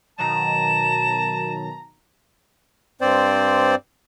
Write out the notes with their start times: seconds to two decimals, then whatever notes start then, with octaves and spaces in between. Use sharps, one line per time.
0.18 B2 D#3 F#3 A5 A#5 E7
3.01 G2 C4 C5 D5